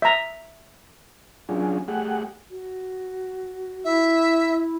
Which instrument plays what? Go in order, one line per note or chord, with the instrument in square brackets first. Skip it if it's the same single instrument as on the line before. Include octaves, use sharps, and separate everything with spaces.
[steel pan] E5 A#5
[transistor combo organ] F#3 C#4 D4 F4 G#4
A3 G4 G#4 F#5
[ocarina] F#4
[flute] E4 [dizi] E5